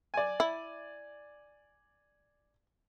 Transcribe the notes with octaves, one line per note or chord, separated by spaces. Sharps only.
D5 G#5
E4